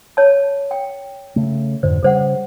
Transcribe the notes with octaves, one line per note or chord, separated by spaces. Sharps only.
C#5 A5
G5
C#3 A3
F2 G#2 D3 C5
C#3 G3 G#4 C5 F#5